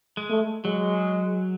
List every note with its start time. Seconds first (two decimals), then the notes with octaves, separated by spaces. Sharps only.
0.17 G#3
0.30 A3
0.65 F#3 G#3